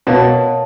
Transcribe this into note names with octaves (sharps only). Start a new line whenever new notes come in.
B2 A#4 C#5 F5 A5